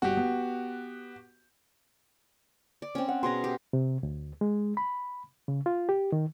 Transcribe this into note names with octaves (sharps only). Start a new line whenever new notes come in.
G1 F#4 G4
B3
D5
C4 C#4
F#5
B2 G#4 A#5 C6
G4
C3
D2
G#3
B5
C#3
F4
G4
D#3